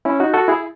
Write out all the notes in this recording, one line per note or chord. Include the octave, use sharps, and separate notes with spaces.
C#4 E4
D#4 F#4
F#4 A4
E4 G#4